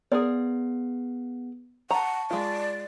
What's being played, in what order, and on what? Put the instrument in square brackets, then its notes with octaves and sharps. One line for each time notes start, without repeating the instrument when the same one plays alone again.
[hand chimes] B3 F#5 [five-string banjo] G#4 A#4 D5
[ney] F#5 [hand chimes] A5 C#6 [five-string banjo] A#5
[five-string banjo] G#3 F4 [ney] D5